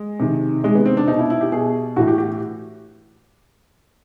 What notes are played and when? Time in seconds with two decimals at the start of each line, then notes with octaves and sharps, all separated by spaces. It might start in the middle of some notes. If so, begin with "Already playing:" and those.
Already playing: G#3
0.20 C3 D#3
0.64 C3 D#3 G#3
0.75 B3
0.86 C4
0.97 D4
1.08 B2 D#4
1.19 E4
1.30 E4
1.41 G4
1.52 B2 G#4
1.96 A2 E3 F#4
2.08 G4
2.18 G4